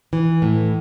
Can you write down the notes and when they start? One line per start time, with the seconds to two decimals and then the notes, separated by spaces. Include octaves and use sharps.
0.13 E3
0.42 A2